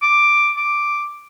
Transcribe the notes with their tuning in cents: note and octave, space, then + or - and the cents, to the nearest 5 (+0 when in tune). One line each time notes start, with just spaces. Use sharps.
D6 +5
D6 +0